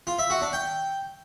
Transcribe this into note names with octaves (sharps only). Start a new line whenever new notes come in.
F4
E5
F#4
D4
G5